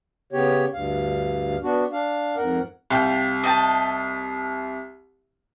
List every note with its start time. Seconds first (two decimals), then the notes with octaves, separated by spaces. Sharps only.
0.33 C#3 B3 G4 C#5
0.73 D2 G2 F5
1.63 B3 D4 F#4
1.92 D4 F5
2.37 F2 G#2 A#4 F#5
2.90 C2 F5 G5
3.43 D#5 G5 A5